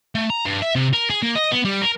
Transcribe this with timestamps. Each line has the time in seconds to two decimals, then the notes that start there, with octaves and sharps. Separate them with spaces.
0.15 A3
0.30 A#5
0.45 G2
0.62 E5
0.75 C3
0.93 A#4
1.10 G#4
1.23 A#3
1.35 D#5
1.51 B3
1.65 G3
1.82 A#4